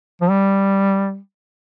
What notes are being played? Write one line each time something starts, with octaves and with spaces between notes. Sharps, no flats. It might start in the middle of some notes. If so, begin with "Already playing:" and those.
F3
G3